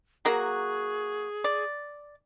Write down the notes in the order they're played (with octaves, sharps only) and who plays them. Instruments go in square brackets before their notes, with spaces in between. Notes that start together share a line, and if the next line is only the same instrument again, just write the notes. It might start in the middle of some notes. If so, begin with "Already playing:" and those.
[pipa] F#3 A#3 F#4 [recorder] G#4
[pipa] D5